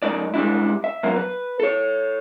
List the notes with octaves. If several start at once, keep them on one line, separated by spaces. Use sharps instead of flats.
F#2 A3 D#4 D5
G#2 G3 D4 E4
E5
F3 F#3 A#3 B3
B4
A4 C#5